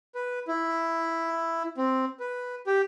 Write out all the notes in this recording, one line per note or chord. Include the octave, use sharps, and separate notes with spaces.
B4
E4
C4
B4
G4